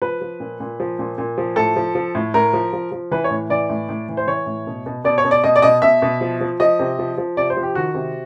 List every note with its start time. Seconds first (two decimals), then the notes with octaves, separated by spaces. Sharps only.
0.02 F3 B4
0.21 F3
0.40 A#2
0.60 A#2
0.80 F3
0.99 A#2
1.18 A#2
1.38 F3
1.56 A2 A4
1.76 F3
1.95 F3
2.15 A2
2.34 A2 A#4
2.53 F3
2.73 F3
2.92 F3
3.11 E3 B4
3.24 C#5
3.30 A2
3.50 E3 D5
3.69 A2
3.89 A2
4.09 E3
4.17 C5
4.27 E3 C#5
4.46 A2
4.67 B2
4.86 B2
5.04 B2 D5
5.18 C#5
5.24 B2
5.31 D5
5.44 B2 D#5
5.56 D5
5.62 B2 D#5
5.82 B2 E5
6.02 B2
6.21 F3
6.41 F3
6.60 F3 D#5
6.79 C3
6.99 F3
7.18 F3
7.37 C3 D5
7.50 C5
7.57 F3
7.63 G4
7.75 D#3 F#4
7.95 C3